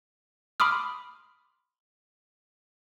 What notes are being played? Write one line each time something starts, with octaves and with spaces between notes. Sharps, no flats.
B5 C6 D6 D#6 F6